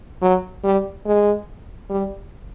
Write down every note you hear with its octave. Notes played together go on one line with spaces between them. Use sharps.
F#3
G3
G#3
G3